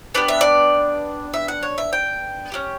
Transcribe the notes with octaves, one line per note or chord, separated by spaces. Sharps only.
B3 D4 G4 D5
E5
D5
E5
F#5
C#5
E5
G5
C#4 E4 G4